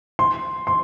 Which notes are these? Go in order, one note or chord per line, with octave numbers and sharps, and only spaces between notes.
C6
C6